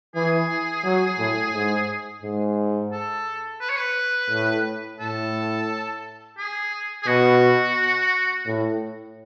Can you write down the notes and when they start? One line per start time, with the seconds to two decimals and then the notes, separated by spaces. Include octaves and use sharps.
0.15 E3 G#4
0.84 F#3
1.19 A2
1.54 G#2
2.23 G#2
2.92 A4
3.61 B4
3.69 C#5
3.77 B4
4.30 A2
5.00 A2 A4
6.38 G#4
7.03 G#4
7.07 B2 F#4
8.46 A2